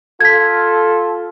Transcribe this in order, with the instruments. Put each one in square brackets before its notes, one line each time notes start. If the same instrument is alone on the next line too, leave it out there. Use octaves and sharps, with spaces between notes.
[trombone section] F4 A4 [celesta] G#6 B6